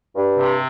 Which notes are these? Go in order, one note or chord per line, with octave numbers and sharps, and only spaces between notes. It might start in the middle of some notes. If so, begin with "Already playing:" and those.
G2
C3